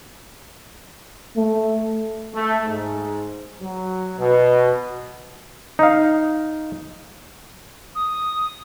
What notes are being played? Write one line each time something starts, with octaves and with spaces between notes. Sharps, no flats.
A3
A3
G#2
F#3
B2
D#4 F5
D#6